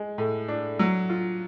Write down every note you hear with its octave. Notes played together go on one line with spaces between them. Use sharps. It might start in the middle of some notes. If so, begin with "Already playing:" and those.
Already playing: G#3
A2
D4
F#3
F4